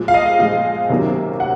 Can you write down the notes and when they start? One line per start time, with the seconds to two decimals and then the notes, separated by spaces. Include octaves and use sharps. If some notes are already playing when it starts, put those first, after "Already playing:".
Already playing: A#2 F3 G#3
0.08 F5
0.14 D#5
0.39 A#2 F3 G#3 F5
0.89 C3 D#3 F#3 A#3 C#4
1.40 F#5